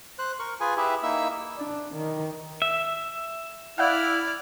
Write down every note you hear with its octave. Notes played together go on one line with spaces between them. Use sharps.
C5 F#6
A#4 C#6
F4 G#4 B4 G#5
E4 G4 G#4 B4 E5
A#3 D#4 E4 E5 E6
D4
D#3
E5
E4 D5 F5 F#5 F6 F#6